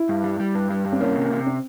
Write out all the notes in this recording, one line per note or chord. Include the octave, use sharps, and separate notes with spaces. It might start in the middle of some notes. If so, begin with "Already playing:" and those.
Already playing: E4
G2
G3
G3
G2
G3
G2
C4
A#3 C#4
C3
C3
C4